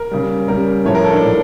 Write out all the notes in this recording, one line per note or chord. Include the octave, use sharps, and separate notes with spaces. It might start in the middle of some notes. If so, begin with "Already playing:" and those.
Already playing: A#4
C#3 G3
C#3 G3 A#4
A2 F3 A3 C#5
A#4
A4
D4
A2 F3 A3